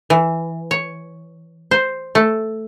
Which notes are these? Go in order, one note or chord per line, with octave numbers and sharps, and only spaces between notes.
E3
C#5
C5
A3